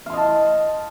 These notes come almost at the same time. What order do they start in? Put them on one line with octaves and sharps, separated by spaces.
F5 C6 D#5 A5